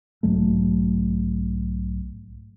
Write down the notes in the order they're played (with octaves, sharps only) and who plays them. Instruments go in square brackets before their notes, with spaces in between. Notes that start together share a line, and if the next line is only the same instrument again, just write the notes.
[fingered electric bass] B1 G#2 F#3 A3